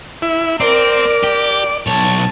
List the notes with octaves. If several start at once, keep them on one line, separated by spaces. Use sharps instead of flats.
E4
C4 A#4 D5
G4
B1 C#5 A5